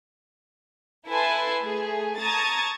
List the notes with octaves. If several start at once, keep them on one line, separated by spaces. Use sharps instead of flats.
E4 A4 B4 G#5 A5 C6
A3 G#4
A5 A#5 C#6 D#6 G#6 A6